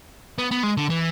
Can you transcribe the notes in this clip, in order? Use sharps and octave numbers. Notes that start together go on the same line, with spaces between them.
B3
B3
G#3
D3
E3